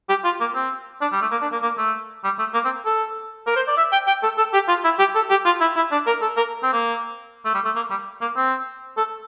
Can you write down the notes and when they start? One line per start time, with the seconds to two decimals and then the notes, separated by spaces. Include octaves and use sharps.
0.09 G4
0.24 F4
0.40 A#3
0.55 C4
1.01 D4
1.12 G3
1.21 A3
1.31 A#3
1.42 D4
1.52 A#3
1.63 A#3
1.78 A3
2.24 G3
2.39 A3
2.54 A#3
2.65 C4
2.85 A4
3.47 A#4
3.56 C5
3.67 D5
3.77 E5
3.92 G5
4.07 G5
4.23 A4
4.38 A4
4.54 G4
4.68 F4
4.84 E4
4.99 G4
5.15 A4
5.30 G4
5.45 F4
5.60 E4
5.76 E4
5.92 D4
6.07 A#4
6.22 A4
6.37 A#4
6.63 C4
6.73 A#3
7.45 A3
7.54 G3
7.65 A3
7.76 A#3
7.90 G3
8.21 A#3
8.36 C4
8.97 A4